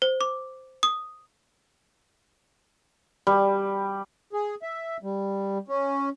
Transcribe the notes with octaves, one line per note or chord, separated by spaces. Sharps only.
C5
D6
D#6
G3
G#4
E5
G3
C#4